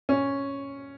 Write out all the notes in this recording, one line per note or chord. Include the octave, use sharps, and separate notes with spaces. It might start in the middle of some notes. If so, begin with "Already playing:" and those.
C#4